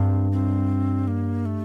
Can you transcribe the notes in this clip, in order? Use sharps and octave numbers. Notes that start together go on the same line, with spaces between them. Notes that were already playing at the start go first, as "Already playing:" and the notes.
Already playing: G2 C4
C4
A#3
A3